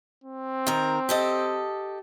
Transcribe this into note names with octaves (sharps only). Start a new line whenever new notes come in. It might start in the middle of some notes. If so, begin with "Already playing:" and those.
C4
D#3 A#4
G4 A4 D#5